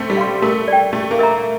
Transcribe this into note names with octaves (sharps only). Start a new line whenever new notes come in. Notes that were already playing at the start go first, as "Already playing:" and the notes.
Already playing: A3 C4
G3
F5 C6
A3 A#4
D5 G5
A3 G4
A#3
A#4 E5 A#5